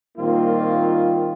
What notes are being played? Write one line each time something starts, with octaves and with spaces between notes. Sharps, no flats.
A#2 D#3 G3 A#3 C4 F4